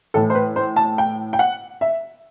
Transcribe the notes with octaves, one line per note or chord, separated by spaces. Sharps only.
A2 E3 A4
C5
B4
C5
A5
G5
G5
F#5
E5